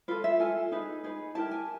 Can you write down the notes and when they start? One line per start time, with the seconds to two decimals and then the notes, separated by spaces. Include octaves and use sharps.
0.08 F4 A4 B4
0.24 E5
0.39 F4 A4 G#5
0.72 D#4 G#4 B4
1.04 D#4 G#4 B4
1.35 E4 G4 A#4 A5
1.51 G#5